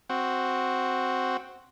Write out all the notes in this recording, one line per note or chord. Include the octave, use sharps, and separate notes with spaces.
C4 F#4